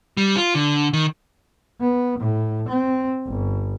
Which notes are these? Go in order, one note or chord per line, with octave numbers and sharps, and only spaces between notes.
G3
F4
D3
D#3
B3
A2
C4
G1